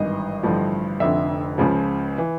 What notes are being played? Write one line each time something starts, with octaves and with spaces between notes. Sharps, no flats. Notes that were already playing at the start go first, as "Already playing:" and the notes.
Already playing: G#1 G2 E3 D#5
A1 G2 D3 F3
F1 F2 D3 E5
C#2 C#3 F3
E3